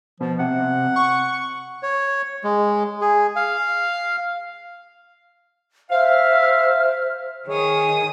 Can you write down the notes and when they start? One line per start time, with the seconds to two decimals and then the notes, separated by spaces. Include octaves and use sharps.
0.20 B2 F3
0.40 C3 F#5
0.96 C#6
1.83 C#5
2.44 G#3
3.02 G#4
3.36 F5
5.91 C5 E5 F5 F6
7.48 D#3 G#4 C#5 D#6